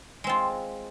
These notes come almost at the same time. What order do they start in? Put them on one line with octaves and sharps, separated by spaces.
G#3 C4 F4